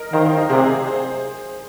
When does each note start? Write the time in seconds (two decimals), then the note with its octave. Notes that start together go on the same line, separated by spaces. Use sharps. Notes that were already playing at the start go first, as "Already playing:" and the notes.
Already playing: A#4 D#5
0.12 D#3 C5 F5
0.25 C5 F5
0.37 A#4 D#5
0.50 C3 G#4 C5
0.87 C5